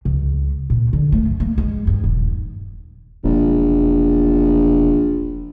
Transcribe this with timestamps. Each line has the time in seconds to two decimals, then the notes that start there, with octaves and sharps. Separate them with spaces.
0.05 C#2
0.70 A#2
0.93 D3
1.12 A3
1.26 F#2
1.40 A#3
1.58 G#3
1.87 G2
2.04 D#1
3.24 E1 A#1